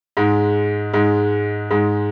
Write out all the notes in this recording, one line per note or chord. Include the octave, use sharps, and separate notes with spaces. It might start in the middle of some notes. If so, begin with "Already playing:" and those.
G#2 G#3
G#2 G#3
G#2 G#3